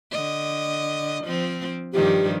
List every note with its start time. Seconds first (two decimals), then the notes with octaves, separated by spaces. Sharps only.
0.11 D3 D#5
1.24 F3 C4
1.93 G2 D#3 F3 G4